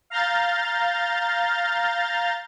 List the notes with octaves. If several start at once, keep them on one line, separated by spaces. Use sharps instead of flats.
F5 A#5 F6 G6 A6